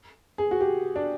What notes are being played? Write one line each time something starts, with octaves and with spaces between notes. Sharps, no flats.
G#4
F#4
G4
D4